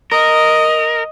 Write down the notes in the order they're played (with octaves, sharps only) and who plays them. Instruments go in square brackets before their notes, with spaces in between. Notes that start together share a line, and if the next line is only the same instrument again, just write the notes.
[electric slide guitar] A#4 [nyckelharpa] D#5